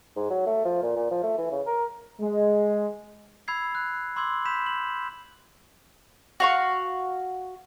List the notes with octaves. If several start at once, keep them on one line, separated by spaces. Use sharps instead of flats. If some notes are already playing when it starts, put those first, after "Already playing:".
G#2
F#3
A3
F3
A#2
A#2
F3
A3
E3
C#3
A#4
G#3
B5 E6 G#6 C7
F#6
B5 C6 D6 E6 G#6 F#7
B5 G6 B6 E7
F#7
F#4 F5 C#6